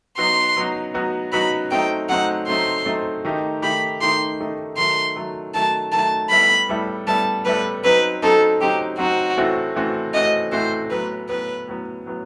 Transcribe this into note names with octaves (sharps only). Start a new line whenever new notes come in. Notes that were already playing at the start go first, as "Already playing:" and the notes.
F#3 B3 D#4 F#4 C6
F#3 B3 D#4 F#4
F#3 B3 D#4 F#4
F#3 B3 D#4 F#4 B5
F#3 A3 C4 D#4 G5
F#3 A3 C4 D#4 F#5
F#3 A3 C4 D#4 C6
F#3 A3 C4 D#4
D#3 A3 D#4 G4
D#3 A3 D#4 G4 B5
D#3 A3 D#4 G4 C6
D#3 A3 D#4 G4
D#3 F#3 A3 C6
D#3 F#3 A3
D#3 F#3 A3 A5
D#3 F#3 A3 A5
A2 G3 B3 E4 A4 B5
A2 G3 B3 E4 A4
A2 G3 B3 E4 A4 A5
A2 G3 B3 E4 A4 B4
F#3 C4 D#4 B4
F#3 C4 D#4 A4
F#3 C4 D#4 G4
F#3 C4 D#4 F#4
A2 E3 A3 C4 F#4
A2 E3 A3 C4 F#4
A2 E3 A3 C4 F#4 D#5
A2 E3 A3 C4 F#4 C5
A2 F#3 B3 B4
A2 F#3 B3 B4
A2 F#3 B3
A2 F#3 B3